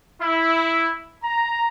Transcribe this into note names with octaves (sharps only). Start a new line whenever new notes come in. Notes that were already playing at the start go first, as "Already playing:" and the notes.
E4
A#5